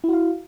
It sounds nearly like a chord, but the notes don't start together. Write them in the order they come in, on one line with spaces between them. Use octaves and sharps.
E4 F#4 F5